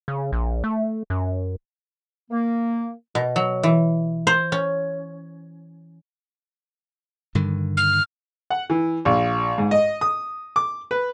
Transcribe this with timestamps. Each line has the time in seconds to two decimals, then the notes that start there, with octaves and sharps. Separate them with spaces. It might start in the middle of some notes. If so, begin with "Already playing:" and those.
0.08 C#3
0.32 A#1
0.64 A3
1.10 F#2
2.31 A#3
3.15 B2
3.36 F#3
3.63 E3
4.27 C5
4.52 C#4
7.35 G2 D3 D#3
7.77 F6
8.50 F#5
8.70 E3
9.05 A#1
9.58 G#2
9.71 D#5
10.01 D#6
10.56 D6
10.91 B4